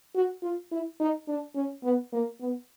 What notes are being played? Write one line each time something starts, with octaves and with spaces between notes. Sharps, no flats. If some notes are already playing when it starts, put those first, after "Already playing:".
F#4
F4
E4
D#4
D4
C#4
B3
A#3
B3